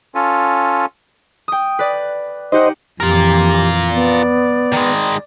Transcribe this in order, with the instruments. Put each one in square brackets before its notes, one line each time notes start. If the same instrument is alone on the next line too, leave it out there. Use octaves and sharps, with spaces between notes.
[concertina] C#4 F4 A4
[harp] G5 D#6
B4 D5
[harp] D#4 G4 F#5 [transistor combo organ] C5 D#5
[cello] F2 E3 [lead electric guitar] F4 A#4 [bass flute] G4
[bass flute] B3 [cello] D5
[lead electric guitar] D#3 G#3